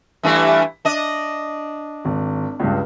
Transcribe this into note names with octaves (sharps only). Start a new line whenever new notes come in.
G2 E3 A3
D4 D#5
G#1
C#2 G2